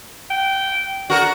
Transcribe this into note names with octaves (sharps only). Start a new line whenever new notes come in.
G5
D3 F#4 A#4